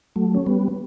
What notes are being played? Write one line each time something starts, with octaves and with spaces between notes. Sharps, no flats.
F#3 A3
C#4
G3 B3